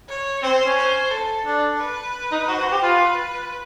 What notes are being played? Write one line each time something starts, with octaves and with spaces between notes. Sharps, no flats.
C#5
C4 C5
C#4
C5
A4
D4 A4
B4
D#4
F#4 C5
F#4
G4
F4 B4